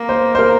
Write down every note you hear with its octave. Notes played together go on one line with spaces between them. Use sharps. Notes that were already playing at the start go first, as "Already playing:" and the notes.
Already playing: A#3
C5
C5
A#4